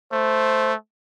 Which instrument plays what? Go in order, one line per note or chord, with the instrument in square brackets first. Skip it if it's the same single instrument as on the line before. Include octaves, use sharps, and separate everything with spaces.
[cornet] A3 [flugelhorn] C5